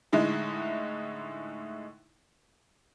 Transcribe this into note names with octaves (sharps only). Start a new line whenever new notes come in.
A2 D3 G#3 D#4 E4